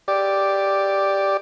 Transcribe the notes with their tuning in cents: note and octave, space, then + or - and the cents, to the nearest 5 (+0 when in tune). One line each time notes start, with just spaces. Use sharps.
G4 +0 D5 +0